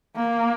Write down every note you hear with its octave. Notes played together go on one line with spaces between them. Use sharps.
A#3